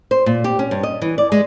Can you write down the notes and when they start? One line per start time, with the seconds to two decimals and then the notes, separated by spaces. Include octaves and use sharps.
0.11 C5
0.26 A#2
0.44 G4
0.59 C#4
0.71 G2
0.83 D#5
1.02 E3
1.18 D5
1.32 G#3